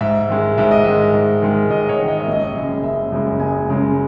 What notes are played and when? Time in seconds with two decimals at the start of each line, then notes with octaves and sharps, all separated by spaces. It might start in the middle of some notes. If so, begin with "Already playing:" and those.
0.01 G#2 E5
0.29 D#3 G#3
0.58 G#2 E5
0.71 D#5
0.85 D#3 G#3 E5
1.14 G#2
1.42 D#3 G#3
1.70 G#2 D#5
1.89 C#5
1.99 D#3 G#3
2.08 D#5
2.20 E5
2.27 F#1
2.33 D#5
2.56 F#2 C#3 G#3
2.83 F#1 E5
3.12 F#2 C#3 G#3
3.40 F#1 G#5
3.68 F#2 C#3 G#3